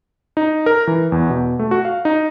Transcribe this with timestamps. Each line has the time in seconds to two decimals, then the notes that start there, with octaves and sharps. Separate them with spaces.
0.37 D#4
0.66 A#4
0.87 E3
1.12 E2
1.30 B2
1.59 A3
1.71 F#4
1.85 F5
2.05 D#4